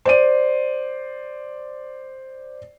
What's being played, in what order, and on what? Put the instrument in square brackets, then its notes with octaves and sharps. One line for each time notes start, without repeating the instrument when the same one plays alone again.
[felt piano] C5 D5 D#7